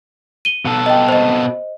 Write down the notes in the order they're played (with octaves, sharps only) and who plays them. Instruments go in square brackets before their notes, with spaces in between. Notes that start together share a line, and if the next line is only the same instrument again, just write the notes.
[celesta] D#7 G7
[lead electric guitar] B2 A4
[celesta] D#5 G5
C5 D#5